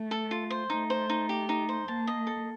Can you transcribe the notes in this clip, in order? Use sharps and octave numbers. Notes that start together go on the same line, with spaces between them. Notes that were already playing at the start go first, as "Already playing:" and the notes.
Already playing: A3
A4
F4
C5
A3 D#4
C5
D#4
G4
D#4
C5
A#3 A5
D#5
A4